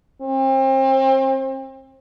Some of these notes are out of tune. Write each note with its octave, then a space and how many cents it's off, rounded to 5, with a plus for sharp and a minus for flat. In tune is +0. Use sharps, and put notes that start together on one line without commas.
C4 +35